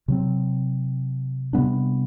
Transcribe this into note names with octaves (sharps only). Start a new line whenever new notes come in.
C3 F#3 C4
C3 G3 B3 D4